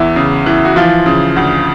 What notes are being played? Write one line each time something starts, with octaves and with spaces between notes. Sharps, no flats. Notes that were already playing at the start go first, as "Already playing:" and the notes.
Already playing: E2 E3 E4
C#3
E3
F#4
E3 F3 F4
C#3
D2